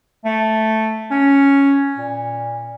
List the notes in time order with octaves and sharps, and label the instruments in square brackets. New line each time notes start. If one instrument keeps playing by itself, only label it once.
[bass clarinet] A3
C#4
A#2